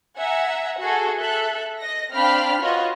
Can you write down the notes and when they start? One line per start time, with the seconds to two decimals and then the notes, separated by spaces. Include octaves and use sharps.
0.18 E5 F#5 G#5 A#5
0.80 F#4 G#4 A4
1.18 A4 E5 F#6
1.79 D#5 A#6
2.12 C4 D4 F5 G5 B5 F6
2.61 F4 F#4 B4 C#5 D#5